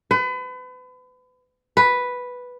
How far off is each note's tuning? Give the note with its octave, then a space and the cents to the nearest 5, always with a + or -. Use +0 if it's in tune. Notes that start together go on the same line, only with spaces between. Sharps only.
B4 +35
B4 +0